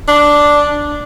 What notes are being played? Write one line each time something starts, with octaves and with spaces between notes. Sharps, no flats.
D4